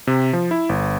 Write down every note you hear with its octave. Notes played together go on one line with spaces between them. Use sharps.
C3
F3
E4
G1